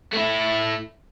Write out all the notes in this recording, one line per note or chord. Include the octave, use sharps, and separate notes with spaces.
A3 E4